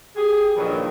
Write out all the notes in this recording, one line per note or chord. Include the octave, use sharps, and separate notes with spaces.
G4 G#4
G2 A#2 D3 D#3 F3 F#3